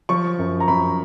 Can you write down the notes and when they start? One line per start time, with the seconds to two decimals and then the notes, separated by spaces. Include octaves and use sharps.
0.09 F3 C#6
0.39 F#2
0.60 A#5
0.68 F#2 B5